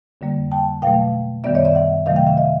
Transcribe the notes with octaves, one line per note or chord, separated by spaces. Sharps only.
F2 D3 G3 A#3
G5 A5
B2 F#3 A3 F5 G5
F#2 D#3 G3 B3 D5 E5
C#5 D#5
D5 E5
E5 F#5
C3 D#3 F#3 A3 D#5 F5
F5 G5
E5 F#5
D#5 F5